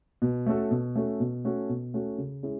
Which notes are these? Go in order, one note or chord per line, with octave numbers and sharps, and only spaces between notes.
B2
A3 C#4 F#4 A4
B2
A3 C#4 F#4 A4
B2
A3 C#4 F#4 A4
B2
A3 C#4 F#4 A4
C#3
G#3 C#4 E4 G#4